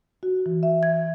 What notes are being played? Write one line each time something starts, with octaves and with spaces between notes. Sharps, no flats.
F#4
E3
E5
G#6